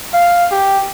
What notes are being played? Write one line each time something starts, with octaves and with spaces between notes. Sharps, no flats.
F5
G4